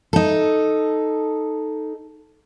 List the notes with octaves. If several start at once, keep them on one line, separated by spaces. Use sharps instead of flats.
D#4 A4